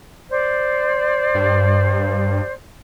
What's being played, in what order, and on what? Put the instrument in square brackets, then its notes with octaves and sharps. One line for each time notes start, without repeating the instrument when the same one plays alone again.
[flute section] C5 D5
[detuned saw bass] G2